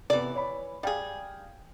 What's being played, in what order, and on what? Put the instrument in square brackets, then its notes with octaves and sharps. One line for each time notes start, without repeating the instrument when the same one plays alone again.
[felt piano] C3 B3 [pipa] E3 D5
[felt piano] C#5 B5
[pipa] G3 G#4 [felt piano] F5 G5